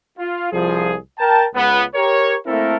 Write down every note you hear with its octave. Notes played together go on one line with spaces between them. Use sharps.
F4
C2 F3 G#4
A#4 G5 A5
C#2 B3
G4 A#4 C#5
A3 A#3 C4 E4 A4 A#4